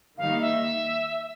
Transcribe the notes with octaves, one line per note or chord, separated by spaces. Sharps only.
D#3 G3 A#3 D#4 F5
E5